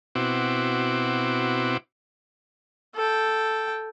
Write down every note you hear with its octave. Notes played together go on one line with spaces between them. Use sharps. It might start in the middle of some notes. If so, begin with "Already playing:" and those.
B2 C4 E4 F#4 D6
A4 G5